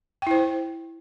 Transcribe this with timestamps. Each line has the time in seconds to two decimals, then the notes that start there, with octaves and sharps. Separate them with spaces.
0.22 G5
0.27 E4
0.31 C5